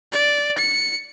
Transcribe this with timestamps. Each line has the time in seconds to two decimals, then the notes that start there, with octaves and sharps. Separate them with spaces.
0.12 D5
0.58 C#7